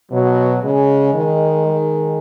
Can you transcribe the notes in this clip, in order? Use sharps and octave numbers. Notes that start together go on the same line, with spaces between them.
B2 F#3
C#3 G#3
D#3
G#3